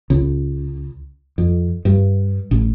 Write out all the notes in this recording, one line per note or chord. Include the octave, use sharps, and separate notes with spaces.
C#2
F2
G2
A1